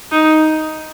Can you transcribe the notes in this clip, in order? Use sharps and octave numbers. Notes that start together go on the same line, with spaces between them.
D#4